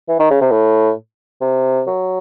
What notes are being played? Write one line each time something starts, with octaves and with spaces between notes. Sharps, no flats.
E3
D#3
C#3
C3
A2
C3
F#3